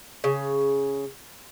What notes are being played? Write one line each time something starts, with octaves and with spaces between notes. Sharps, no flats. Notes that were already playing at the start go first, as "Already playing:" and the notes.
C#3